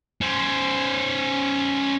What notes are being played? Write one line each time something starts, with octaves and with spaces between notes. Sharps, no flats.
C#4 C5